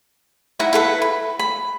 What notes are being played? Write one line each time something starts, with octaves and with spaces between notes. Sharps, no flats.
D#4 E4 E5 F#5
E4 A4 B4
B5
B5